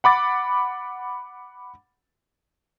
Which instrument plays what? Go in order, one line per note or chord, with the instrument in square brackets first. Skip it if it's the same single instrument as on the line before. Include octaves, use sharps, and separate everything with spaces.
[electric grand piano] F#5 B5 D6 A6